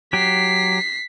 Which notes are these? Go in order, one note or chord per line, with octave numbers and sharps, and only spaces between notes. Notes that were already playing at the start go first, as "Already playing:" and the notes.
F#3 G4 B6 C7